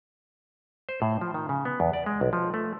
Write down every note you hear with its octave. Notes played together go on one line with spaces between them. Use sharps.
C5
A2
F3
D#3
C#3
B3
E2
D5
G#3
B1
F3
A3